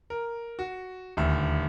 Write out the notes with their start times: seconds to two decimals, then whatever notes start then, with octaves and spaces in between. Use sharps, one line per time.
0.10 A#4
0.59 F#4
1.17 D#1 D2 E5